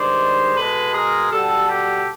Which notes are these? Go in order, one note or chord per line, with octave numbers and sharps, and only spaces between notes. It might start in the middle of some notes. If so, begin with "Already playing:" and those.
Already playing: G2 D#3 G#3 C5 D5
B2 G#3 A4 B4
G#4 A#4
B2 G3 G4 A4
G4 A4